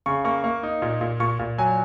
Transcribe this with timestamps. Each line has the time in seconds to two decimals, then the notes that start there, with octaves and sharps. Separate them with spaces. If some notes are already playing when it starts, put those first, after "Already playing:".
0.06 C#3 C#6
0.25 A#3 C#6
0.44 A#3
0.63 D#4
0.82 A#2
1.01 A#2
1.20 A#2 C#6
1.39 A#2
1.58 F#3 G#5